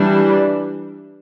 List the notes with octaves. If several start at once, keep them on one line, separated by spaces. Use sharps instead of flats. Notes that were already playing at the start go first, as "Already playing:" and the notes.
Already playing: E3 G3 D4